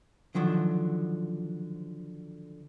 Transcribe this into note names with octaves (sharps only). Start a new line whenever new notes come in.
D3 D#3 F3 F#3